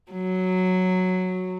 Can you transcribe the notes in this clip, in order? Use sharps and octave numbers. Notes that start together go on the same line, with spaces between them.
F#3